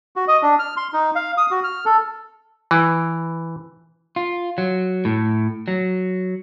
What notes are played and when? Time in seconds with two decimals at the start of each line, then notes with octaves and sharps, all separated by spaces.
0.16 F#4
0.28 D#5
0.43 D4
0.59 F6
0.77 C6
0.94 D#4
1.15 F5
1.38 D#6
1.51 F#4
1.64 F6
1.85 A4
2.71 E3
4.16 F4
4.58 F#3
5.05 A2
5.68 F#3